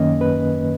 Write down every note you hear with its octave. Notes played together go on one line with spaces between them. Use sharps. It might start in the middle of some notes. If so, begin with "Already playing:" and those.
Already playing: F#2 D#3 A#3 C#4 D#5
B4